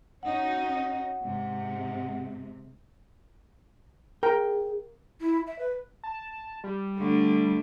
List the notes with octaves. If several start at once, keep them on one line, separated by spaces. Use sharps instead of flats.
C#4 D#4 F#4 F#5
G#2 C3 G#3
G#4 A#4 G5
E4
E5
B4
A5
G3
D3 A3